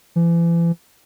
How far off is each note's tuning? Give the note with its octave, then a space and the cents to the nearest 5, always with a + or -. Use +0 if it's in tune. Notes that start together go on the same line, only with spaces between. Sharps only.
E3 +40